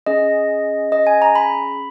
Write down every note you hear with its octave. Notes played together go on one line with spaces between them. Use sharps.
C#4 G#4 D#5
D#5
G#5
A#5
B5